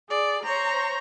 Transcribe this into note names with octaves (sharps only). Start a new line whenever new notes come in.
G#4 D5
C5 C#5 A#5 C#6